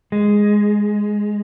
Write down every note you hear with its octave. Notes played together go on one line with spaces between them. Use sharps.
G#3